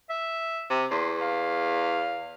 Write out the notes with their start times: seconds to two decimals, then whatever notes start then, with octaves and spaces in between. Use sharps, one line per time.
0.10 E5
0.70 C3
0.91 E2 C6
1.21 F5